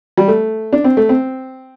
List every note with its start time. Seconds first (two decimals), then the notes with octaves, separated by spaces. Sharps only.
0.17 G3
0.28 A3
0.73 D4
0.84 C4
0.97 A3
1.09 C4